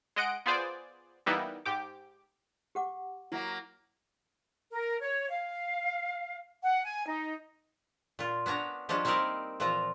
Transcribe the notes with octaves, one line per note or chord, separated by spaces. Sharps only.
G#3 D#5 F#5 D7
B3 F4 G#4 C5 D5
E3 G3 A#3 B3 D#4 E4
G#2 G4 D6
G4 F#5 D6
F#3 A#3 E4 F5
A#4
C#5
F5
F#5
G#5
D#4
A#2 F4
B3 C#4 D4 A#5
F3 G3 G#3 C#4 D4
A#3 C4 D#4 E4 A#4 D5
A#2 E3 F3 F4 A#5